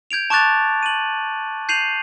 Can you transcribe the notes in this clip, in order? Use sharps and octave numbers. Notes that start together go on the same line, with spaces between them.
G6 G#6 D7 F7
A5 C#6 D6 F#6 A6 F7
D#7 F#7
G6 C7 D#7 F7 F#7